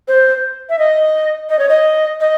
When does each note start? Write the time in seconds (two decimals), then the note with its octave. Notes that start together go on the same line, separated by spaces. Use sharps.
0.08 C5
0.70 E5
0.79 D#5
1.49 D#5
1.59 C#5
1.69 D#5
2.20 D#5